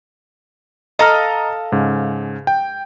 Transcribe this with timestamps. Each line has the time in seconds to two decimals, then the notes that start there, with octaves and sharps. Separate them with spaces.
0.99 A4 D#5 F5 A#5 D#6 F6
1.72 G#2 C#3
2.47 G5